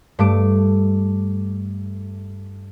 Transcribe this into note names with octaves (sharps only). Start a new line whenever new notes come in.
G2 A3 D6